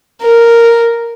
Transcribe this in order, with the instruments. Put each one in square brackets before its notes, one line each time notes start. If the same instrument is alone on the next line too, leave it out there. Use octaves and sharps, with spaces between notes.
[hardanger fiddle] A#4